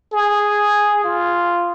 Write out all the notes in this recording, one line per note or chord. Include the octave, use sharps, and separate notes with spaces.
G#4
F4